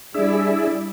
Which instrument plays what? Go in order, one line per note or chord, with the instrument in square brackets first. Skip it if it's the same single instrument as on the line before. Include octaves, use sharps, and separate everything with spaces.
[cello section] G3 E4 D5 [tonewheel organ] D4 G#4 E5